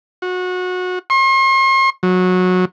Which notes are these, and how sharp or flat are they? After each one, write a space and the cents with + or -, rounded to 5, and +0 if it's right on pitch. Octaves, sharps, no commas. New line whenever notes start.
F#4 -25
C6 +45
F#3 -20